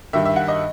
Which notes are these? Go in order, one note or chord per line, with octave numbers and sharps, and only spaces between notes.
G2 D#3 E5
E5
F#5
D#5